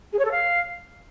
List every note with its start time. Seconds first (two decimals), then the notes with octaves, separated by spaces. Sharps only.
0.12 G#4
0.19 C#5
0.25 A4
0.31 F5